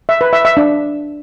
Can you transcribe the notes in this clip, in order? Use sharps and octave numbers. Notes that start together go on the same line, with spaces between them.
E5
B4
E5
E5
D4